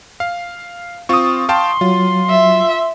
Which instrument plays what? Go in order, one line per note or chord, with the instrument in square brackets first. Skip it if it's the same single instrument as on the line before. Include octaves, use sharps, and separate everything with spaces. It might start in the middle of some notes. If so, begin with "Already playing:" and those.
[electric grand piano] F5
[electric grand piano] C4 F4 [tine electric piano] C#6 D#6
[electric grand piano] F5 G5 A5 [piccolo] C6
[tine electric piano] F#3 [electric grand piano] F4
[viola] E5